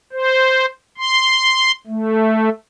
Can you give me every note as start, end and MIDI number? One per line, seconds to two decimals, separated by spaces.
0.13 0.66 72
0.98 1.72 84
1.87 2.49 57